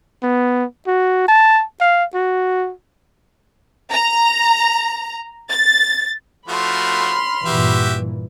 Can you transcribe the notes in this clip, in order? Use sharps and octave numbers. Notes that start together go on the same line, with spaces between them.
B3
F#4
A5
F5
F#4
A#5
A6
F3 A3 F#4 B5 C6 F6
G2 A#2 E3 F#4 G4 E5